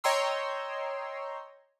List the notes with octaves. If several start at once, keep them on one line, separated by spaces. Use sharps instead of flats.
C#5 D#5 G5 A#5 C6 E6